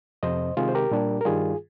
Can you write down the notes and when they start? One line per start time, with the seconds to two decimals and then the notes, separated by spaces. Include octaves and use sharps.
0.23 F2 C3 F3 C5 D#5
0.57 C3 D#3 G#3 F4 G#4
0.69 C5
0.75 G4 A#4
0.91 A#2 G3 D4
1.21 A#4
1.25 G2 D#3 G3 F4 G#4